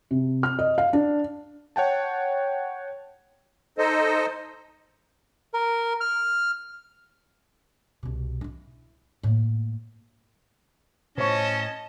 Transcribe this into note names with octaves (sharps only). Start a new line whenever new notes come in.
C3
F6
D#5
F5
D4
C#5 F#5 G5 A5
D#4 A4 C5 D#5
A#4
F6
C2 B2
D#4 E4
A2 A#3
A2 C#4 C5 C#5 D#5 A5 C#6